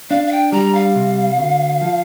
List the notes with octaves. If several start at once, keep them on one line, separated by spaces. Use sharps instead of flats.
D4 F5
F5
G5
G3 A#5
F5
C3
D2
F3